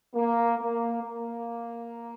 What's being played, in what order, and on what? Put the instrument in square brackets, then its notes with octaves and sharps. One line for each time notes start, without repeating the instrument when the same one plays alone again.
[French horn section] A#3
A#3
A#3